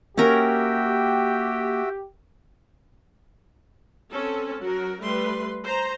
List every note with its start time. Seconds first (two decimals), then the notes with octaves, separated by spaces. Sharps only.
0.18 A#3 C#4 F#4 G4 A#4 E5 G5
4.11 C4 C#4 A4
4.62 F#3 F#4 A#4
5.02 G3 A3 B4 C6
5.64 C5 A#5